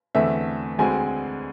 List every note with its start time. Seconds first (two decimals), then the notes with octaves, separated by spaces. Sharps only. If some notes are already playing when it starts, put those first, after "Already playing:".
0.15 E2 D3 A3 C4 E5
0.78 D2 D3 G#3 C4 G#5